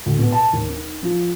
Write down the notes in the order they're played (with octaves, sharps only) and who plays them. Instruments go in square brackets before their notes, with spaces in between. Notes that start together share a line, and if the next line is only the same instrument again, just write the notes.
[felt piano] D2
B2
A5
D#2
D#4
F3